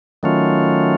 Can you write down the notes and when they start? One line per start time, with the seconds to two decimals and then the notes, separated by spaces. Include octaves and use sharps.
0.23 D#3 F#3 A3 C#4 F4